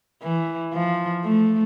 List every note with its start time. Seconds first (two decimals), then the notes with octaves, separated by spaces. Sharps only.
0.23 E3
0.73 F3
1.24 A3